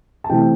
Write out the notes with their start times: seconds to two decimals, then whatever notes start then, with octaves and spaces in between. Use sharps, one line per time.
0.24 A5
0.29 C3 E3 A3 C4 G5